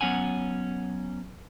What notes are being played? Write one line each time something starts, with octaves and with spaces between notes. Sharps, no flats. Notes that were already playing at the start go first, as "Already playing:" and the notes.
F#3 B3 C#4 F#5 G#5